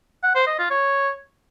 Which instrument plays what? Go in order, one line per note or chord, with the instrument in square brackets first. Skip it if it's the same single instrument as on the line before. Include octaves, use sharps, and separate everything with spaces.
[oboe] F#5
C5
D#5
F4
C#5